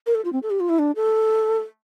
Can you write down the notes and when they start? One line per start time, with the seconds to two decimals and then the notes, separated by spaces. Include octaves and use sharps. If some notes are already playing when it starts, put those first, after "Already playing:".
0.06 A#4
0.15 A4
0.25 F4
0.33 C4
0.43 A4
0.50 G4
0.60 F4
0.69 E4
0.79 D4
0.96 A4